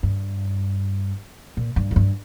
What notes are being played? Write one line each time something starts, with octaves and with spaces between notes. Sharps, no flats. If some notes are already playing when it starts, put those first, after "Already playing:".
G2
A#2
G2
F2
G2